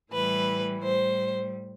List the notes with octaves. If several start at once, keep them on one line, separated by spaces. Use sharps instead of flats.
A2 E3 G3 B4
A2 G3 C5